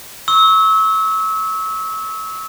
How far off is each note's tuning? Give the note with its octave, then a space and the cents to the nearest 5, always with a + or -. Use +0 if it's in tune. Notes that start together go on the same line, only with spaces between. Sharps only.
C#6 +0 E6 -30